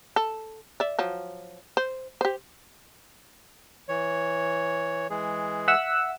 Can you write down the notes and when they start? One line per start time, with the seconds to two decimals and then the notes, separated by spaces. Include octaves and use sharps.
0.16 A4
0.80 D5 E5
0.99 F3 F#3
1.77 C5
2.21 G4 C5
3.89 E3 C#5
5.10 E3 G#3 G#4
5.68 E5 F#5 E6